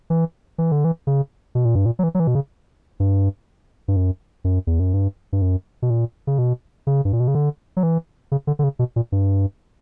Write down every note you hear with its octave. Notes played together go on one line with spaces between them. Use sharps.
E3
E3
D3
E3
C#3
B2
A#2
G2
A#2
F#3
E3
F#3
E3
B2
C#3
G2
G2
F#2
F#2
E2
F#2
G2
G2
F#2
B2
A#2
C#3
B2
C#3
G2
A#2
B2
C#3
D3
F#3
E3
C#3
D3
D3
C#3
B2
A#2
G2